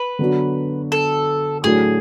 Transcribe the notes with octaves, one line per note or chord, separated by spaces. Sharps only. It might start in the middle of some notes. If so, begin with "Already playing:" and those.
Already playing: B4
D3 F#3 B3 D4 F#4
A4
A2 F#3 A3 D4 F#4 G#4